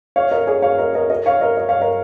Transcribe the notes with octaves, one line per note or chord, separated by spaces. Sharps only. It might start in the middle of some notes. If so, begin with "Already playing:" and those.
C#5 F5
A#4 D#5
G#4 C#5
C#5 F5
A#4 D#5
A#4 D#5
A#4 D#5
C#5 F5
A#4 D#5
A#4 D#5
C#5 F5
A#4 D#5